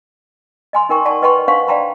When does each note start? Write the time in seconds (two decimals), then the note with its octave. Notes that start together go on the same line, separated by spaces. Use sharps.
0.73 D#5 G#5 C6
0.89 D#4 A#4 G5 C#6
1.05 D5 F#5 A5 C#6
1.22 B4 D#5 G5 A5 C6 C#6
1.48 D4 C5 F5 F#5 C#6
1.68 D5 F5 G5 A5 A#5 C6